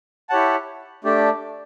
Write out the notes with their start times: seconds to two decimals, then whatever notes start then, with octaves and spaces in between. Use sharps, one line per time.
0.30 E4 G4 C#5 F#5 A5
1.04 A3 D4 G4 D5